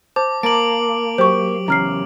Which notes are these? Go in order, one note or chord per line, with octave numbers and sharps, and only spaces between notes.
C5 A5 D6
A#3 A5 A#5 D6 D7 F#7
F#3 G4 C5 C#6
E2 C#3 C#4 A#5 F6 C7